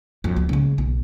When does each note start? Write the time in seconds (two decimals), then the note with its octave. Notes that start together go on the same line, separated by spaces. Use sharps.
0.24 F2 F#3
0.36 C#2
0.49 C#3 G#3
0.78 B1